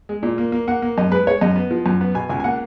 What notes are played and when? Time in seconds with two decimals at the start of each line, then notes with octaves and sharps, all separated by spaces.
0.09 G#3
0.23 A#2
0.38 A#3
0.52 A#3
0.68 A#3 F#5
0.82 A#3
0.98 F#2 D#5
1.11 G#3 B4
1.27 G#3 C#5
1.41 F#2 D#5
1.56 B3
1.71 F3
1.86 F#2
2.01 B3
2.14 B2 G#5
2.29 C#2 G#5
2.40 G#5
2.44 A#3 F#5